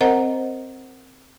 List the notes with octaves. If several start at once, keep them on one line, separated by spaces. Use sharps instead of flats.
C4 A#4 C5 D#5 F#5 A#5